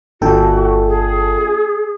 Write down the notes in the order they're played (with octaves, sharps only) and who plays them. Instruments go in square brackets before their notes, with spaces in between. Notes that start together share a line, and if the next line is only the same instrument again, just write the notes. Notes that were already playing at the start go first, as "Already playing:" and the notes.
[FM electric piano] G1 A4 G5 [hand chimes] A#3 D4 F4 [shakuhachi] F#4
[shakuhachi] G#4